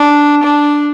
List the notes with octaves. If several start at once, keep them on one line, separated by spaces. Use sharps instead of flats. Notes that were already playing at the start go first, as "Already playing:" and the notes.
Already playing: D4
D4